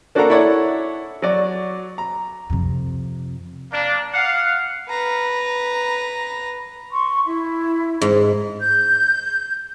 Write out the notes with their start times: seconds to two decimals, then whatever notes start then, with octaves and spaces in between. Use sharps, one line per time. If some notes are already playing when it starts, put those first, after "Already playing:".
0.15 A#3 D4 F#4 A4 F#5 A#5
0.30 E4 A4 C#5 D5 F#5
1.22 F#3 F#4 D5
1.98 A#5
2.50 F2 C3
3.72 A#3 D4
4.14 F5 F#5
4.89 B4 A#5
6.91 C6 C#6
7.24 E4 E5
8.01 G#2
8.61 G6